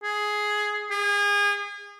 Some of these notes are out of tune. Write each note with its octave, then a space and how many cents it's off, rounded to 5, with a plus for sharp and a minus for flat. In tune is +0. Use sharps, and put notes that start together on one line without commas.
G#4 +10
G#4 -30